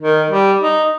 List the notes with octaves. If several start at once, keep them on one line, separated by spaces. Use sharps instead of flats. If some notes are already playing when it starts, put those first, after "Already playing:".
D#3
G3
D#4